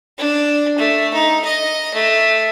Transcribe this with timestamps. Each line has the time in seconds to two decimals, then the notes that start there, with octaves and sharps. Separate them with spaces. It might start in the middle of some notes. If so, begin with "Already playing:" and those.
0.18 D4
0.78 A3
1.14 D#4
1.45 D#5
1.94 A3